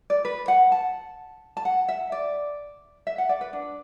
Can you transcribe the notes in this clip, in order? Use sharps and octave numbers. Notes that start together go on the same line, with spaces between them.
D5
B4
F#5
A5
A5
F#5
E5
D5
E5
F#5
D5
B4
D4